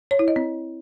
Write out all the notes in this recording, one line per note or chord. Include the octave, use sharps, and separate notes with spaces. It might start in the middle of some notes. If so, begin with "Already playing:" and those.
C#5
E4
D#5
C4